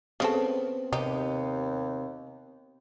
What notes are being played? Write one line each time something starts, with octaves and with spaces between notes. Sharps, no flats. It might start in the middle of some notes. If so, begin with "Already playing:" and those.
C#3 B3 C4 A4
D#2 C3 D#4 G4